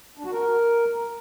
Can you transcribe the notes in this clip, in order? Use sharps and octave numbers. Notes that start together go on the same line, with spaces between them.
D4
F#4
A#4